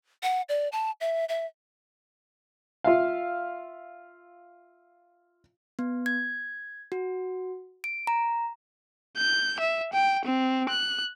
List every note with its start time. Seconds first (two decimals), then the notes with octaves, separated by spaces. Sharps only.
0.23 F#5
0.49 D5
0.72 A5
1.01 E5
1.29 E5
2.84 F4 E5 F5
5.79 B3
6.06 G#6
6.92 F#4
7.84 D7
8.07 A#5
9.17 G6
9.60 E5
9.93 G5
10.25 C4
10.69 F#6